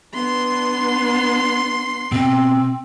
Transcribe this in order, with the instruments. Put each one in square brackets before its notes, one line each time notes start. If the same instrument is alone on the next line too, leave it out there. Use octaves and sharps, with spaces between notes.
[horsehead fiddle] B3 D4 [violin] C6
[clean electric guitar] B2 [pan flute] C4